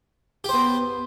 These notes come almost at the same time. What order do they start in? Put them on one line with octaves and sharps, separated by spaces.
G4 C5 B3